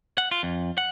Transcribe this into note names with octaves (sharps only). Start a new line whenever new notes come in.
F#5
F4
F2
F#5